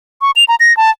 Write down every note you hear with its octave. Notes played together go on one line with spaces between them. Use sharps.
C#6
F7
A#5
A#6
A5